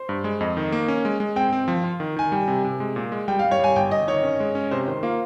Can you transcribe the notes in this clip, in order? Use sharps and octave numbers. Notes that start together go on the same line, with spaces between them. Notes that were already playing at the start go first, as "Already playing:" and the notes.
Already playing: C5
G2
G#3
F2 D#5
D#3
A#3
C#4
G#3
G#3
C4 G5
C4
F3
F4
D#3
D#3 G#5
G3 G5
C3
C3
G#3
A#2
G#3
G3 G5
F5
G3
C#5
G3 G#5
G1 G5
G1 D#5
D#3 C#5
C#4
G#3
C#4
C3 C5
D#3 C5
A#3 F4